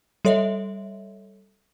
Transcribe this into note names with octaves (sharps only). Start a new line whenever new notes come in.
G3 A4 C#5 D#5 E5